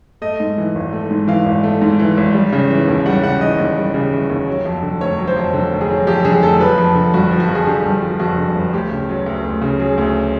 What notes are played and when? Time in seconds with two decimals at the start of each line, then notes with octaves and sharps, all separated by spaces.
0.22 A3 D#5
0.40 G#2
0.58 E3
0.75 G#1
0.93 A3
1.11 G#2
1.28 E3 F5
1.46 G#1
1.63 A3
1.82 G#2
2.00 E3
2.17 G#1
2.34 G3
2.53 C#3
2.71 E3
2.88 D#2
3.06 G3 F#5
3.23 C#3 F#5
3.41 E3 D#5
3.58 D#2
3.77 G3
3.94 C#3
4.12 E3
4.30 D#2
4.48 F#3
4.66 F2
4.83 D3
5.01 F1 C#5
5.18 F#3
5.27 C5
5.36 F2
5.54 D3
5.72 F1
5.81 G#4
5.89 F#3
6.07 F2 G4
6.24 D3 G#4
6.43 F1 A4
6.60 F3 B4
6.78 F2
6.95 D3
7.14 G1 F#4
7.31 F3
7.40 F#4
7.49 F2
7.55 G#4
7.67 D3 G4
7.85 G1
8.02 F3
8.20 F2 F#4
8.38 D3
8.55 G1
8.73 D2 G4
8.91 C#3
9.09 F#3
9.26 D2
9.44 D2
9.61 C#3
9.80 F#3 G#4
9.98 D2